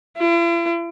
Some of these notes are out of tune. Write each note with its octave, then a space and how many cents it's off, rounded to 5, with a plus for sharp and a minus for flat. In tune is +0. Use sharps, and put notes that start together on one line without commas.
E4 +45